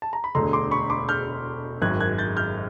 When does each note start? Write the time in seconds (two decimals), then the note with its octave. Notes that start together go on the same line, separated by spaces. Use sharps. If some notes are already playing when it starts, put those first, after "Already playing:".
0.02 A5
0.13 A#5
0.24 B5
0.35 E1 D2 D3 A#5 C6
0.53 C6 D6
0.71 B5 C#6
0.90 C6 D6
1.09 F6 G6
1.81 G#1 F#2 D#3 F#6 G#6
2.00 F#6 G#6
2.18 G6 A6
2.37 F6 G6